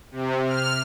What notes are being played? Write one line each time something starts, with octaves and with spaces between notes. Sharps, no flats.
C3
F6